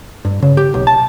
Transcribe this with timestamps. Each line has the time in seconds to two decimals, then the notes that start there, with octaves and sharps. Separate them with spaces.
0.25 G2
0.42 C#3
0.57 G4
0.74 B1
0.87 A5